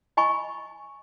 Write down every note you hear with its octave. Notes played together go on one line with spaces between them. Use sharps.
D#5 G#5 B5 C#6